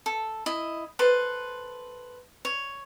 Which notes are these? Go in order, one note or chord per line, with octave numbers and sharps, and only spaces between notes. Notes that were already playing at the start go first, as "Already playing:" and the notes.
A4
E4 D#5
A4 B4 C5
C#5